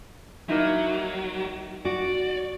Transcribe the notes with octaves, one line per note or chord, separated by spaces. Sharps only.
F#3 A#3 D#4 E4
F#4 D5